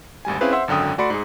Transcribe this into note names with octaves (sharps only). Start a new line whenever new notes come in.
G#1 D2 G3 G#5
C4 C#4 E4 G#4 B4 F5
C5 E5 F#5 C6 E6
G#1 F#2 D3 G5 D#6
A3 F#4 D5 B5 C6 C#7
G#2 G#4